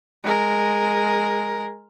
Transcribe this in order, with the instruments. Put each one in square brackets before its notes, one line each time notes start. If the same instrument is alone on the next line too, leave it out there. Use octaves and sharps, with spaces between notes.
[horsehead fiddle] G#3 A#4